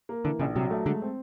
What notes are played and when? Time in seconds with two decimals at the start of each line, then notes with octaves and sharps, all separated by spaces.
0.09 A#3
0.24 D3 E3
0.40 A#1 C#3
0.56 C3 F#3
0.70 A3
0.86 D3 G#3
1.02 C4